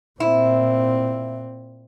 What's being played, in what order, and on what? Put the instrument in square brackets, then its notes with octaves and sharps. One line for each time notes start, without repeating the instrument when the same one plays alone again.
[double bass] A#2 C4 [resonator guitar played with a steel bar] E4